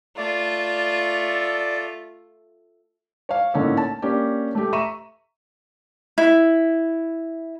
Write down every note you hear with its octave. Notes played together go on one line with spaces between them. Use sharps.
A3 F4 D5
C#5 F5
A2 D3 A#3 C#4 D#4 A4
A5
A#3 C#4 D4 G4
A3 G4
E5 A#5 C#6 D#7 E7
E4